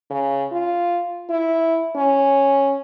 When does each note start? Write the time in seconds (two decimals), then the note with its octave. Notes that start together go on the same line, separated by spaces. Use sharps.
0.10 C#3
0.52 F4
1.30 E4
1.96 C#4